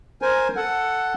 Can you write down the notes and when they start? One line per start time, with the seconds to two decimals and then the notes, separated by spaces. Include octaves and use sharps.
0.22 A#4 C5 G#5
0.56 A4 F#5